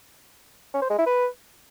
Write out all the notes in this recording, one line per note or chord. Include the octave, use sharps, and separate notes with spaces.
C#4
C5
G#3
E4
B4